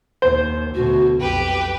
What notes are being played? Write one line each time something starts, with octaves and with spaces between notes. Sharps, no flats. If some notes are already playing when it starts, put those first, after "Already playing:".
D#2 C5
D2 B2 F#4
B1 F2 G4 B4 G5